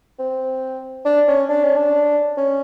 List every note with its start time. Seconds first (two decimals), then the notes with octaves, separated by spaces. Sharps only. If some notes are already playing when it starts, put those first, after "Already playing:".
0.19 C4
1.05 D4
1.28 C#4
1.49 D4
1.63 C#4
1.76 D4
2.37 C#4